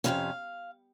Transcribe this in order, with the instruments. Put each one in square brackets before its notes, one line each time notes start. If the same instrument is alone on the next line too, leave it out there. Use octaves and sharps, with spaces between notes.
[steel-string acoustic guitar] F2 C3 E3 A3 C#4 F5